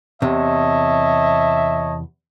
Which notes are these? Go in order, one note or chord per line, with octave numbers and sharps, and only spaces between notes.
E2 C3 C#5 D#5 E5 A5